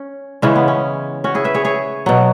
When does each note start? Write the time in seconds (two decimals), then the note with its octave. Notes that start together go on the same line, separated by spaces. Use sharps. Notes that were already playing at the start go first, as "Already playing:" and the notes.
Already playing: C#4
0.42 C#3 E3 G#3 C#4
0.56 B3
0.68 C#4
1.24 C#4 F#4
1.35 E4 G#4
1.44 B4 E5
1.54 G#4 C#5
1.65 G#4 C#5
2.06 B2 F#3